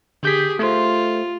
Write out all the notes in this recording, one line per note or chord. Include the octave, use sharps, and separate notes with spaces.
D3 G4 G#4 G6 B6
A3 F4 C5